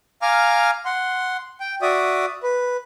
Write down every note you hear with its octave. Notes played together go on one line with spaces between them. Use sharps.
F5 G#5 A#5 D6 F6
F#5 C6
G5
F#4 D5 E5 D#6
B4